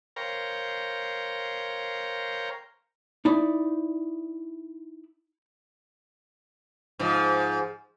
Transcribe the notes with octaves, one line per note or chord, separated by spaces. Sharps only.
A#4 C5 C#5 F5 G5 A#5
D#4 E4 D5
G#2 F3